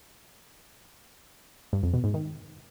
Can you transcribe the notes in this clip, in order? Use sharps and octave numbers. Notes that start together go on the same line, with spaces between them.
G2
F2
B2
G#2
D#3